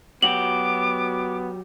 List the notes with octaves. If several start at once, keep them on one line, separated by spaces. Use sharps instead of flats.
F#3 B3 F#4 G4 D6 F#7